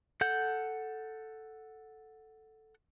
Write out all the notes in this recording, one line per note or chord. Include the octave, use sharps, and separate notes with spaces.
A4 F#5 G6